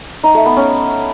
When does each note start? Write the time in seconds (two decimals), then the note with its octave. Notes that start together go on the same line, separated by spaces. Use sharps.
0.24 D#4
0.35 A3
0.46 B3
0.57 C#4